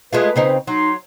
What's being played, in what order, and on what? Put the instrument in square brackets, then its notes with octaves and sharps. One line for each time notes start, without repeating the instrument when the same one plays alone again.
[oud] G#3 A3 F4 [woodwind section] B4
[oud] C#3 C4 D#4
[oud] F#3 [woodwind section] D#4 C6